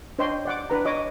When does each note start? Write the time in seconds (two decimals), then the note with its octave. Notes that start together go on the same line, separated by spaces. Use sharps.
0.19 D4 C5 C#5 D#5 G5 C6
0.45 D5 F#5 D6
0.70 D4 B4 A#5
0.85 C#5 D#5 D6